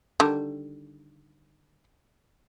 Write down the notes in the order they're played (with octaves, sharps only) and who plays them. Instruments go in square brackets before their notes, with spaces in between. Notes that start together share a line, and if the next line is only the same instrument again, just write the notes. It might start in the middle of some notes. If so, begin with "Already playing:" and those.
[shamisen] D3 D#3 G3